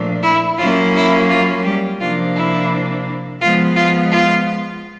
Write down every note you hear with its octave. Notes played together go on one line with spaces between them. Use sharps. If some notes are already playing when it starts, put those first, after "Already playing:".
Already playing: A#2 F3 A3 D4
E4
F#3 A#3 C#4 E4 F4
E4
F4
G3 G4
C3 F3 A#3 D4 F4
E4
F3 G#3 B3 F4
F4
F4